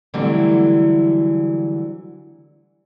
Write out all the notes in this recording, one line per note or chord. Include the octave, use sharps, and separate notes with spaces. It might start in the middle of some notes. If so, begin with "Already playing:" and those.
D3 E3 F#3 G3 A3 C4